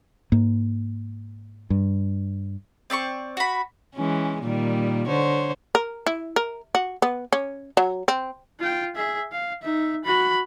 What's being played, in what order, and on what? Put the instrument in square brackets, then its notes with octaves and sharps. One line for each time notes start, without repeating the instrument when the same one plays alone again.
[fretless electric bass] G#2 A#3
G2
[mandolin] C4 D5 E5 C#6
F#4 B5
[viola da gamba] E3 G#3 C#4
A#2 D#3 G3
D3 C5 C#5
[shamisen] A#4
E4
A#4
F#4
B3
C#4
F#3
C4
[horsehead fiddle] F4 G5
G#4 E5
F5
D#4 E5
F#4 B5